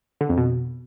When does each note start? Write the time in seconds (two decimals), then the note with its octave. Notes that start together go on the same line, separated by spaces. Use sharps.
0.21 D3
0.29 F2
0.38 B2